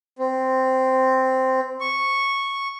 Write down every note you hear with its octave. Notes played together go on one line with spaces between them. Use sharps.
C4
C#6